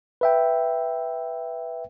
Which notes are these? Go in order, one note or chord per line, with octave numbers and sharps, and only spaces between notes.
B4 E5 G5